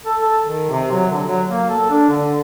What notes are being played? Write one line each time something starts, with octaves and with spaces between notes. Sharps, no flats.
A4
A4
D#3
C3
F#3
D3
F#3
A#3
A4
D4
D3